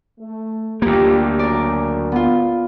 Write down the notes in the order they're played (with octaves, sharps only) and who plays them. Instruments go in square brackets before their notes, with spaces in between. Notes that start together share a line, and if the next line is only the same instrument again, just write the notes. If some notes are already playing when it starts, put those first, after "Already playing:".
[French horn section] A3
[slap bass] D2 A#3 [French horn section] G3 F4 G4
[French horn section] C#3 F#3 [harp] A#4 D5
[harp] B3 F4